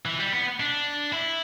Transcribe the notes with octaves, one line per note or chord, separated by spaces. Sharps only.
E3
G3
B3
D4
E4